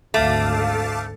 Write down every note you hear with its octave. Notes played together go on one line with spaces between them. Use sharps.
G#1 D2 G#2 A3 F5 A5 D6